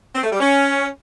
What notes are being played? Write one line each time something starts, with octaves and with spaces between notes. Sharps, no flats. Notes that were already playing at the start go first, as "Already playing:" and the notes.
C4
A3
G3
C#4